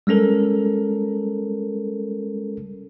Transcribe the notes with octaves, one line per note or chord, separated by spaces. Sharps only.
G3 G#3 C#4 A4 A#4